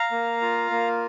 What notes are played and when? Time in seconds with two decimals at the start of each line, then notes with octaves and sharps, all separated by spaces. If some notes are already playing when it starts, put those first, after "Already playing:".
Already playing: F5 A#5
0.11 A#3
0.41 F4
0.71 A#3